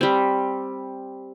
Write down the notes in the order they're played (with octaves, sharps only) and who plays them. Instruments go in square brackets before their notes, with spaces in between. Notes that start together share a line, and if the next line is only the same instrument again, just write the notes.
[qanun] G3 C4